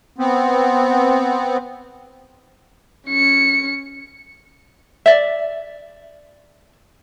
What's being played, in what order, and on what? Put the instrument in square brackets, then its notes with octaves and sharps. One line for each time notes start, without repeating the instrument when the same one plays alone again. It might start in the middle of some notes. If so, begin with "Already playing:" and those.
[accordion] B3 C4
[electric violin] C#4 C#7
[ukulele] D5 E5